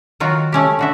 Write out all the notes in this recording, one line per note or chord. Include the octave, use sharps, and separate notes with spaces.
D#3 F#3 F4 F#4
A3 C#4 G4
D3 F#4 E5